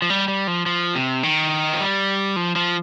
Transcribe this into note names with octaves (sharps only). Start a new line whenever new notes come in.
F3
G3
G3
F3
F3
C3
D#3
F3
G3
F3
F3